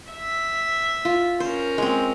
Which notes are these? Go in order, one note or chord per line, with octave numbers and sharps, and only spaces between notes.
E5
F4
C#4 A#4 C5
G#3 C4